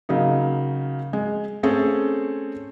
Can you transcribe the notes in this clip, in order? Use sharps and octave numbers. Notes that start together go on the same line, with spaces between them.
C#3 F#3 A#3 D#4
G#3
A3 C4 C#4 G#4 A4